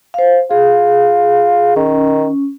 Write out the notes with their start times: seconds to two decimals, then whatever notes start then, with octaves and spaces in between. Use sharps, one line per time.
0.14 C5 F5
0.51 F4 G#4
1.76 D#3 C#4